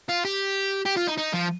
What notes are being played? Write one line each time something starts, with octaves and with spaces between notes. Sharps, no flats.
F4
G4
G4
F4
D#4
D#4
F3